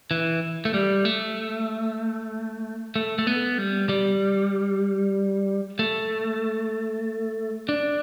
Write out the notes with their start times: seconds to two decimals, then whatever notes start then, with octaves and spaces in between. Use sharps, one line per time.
0.11 E3
0.65 A3
0.74 G3
1.05 A3
2.96 A3
3.19 A3
3.27 B3
3.58 G3
3.89 G3
5.79 A3
7.69 D4